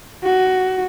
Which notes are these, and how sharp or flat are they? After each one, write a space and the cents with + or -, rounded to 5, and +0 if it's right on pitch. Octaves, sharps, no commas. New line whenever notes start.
F#4 +15